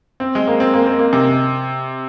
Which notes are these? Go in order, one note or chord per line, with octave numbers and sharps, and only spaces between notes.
C4
G#3
A#3
C4
A#3
C4
A#3
C3